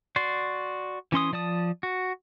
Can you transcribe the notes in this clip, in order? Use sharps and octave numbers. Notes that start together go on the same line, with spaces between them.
F#4 D5 C6
E3 C#4 C6 D#6
F3 D5 A5 D#6
F#4